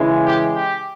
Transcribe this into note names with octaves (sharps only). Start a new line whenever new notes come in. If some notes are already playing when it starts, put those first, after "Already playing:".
Already playing: C#3 E3 G#3
G4
G4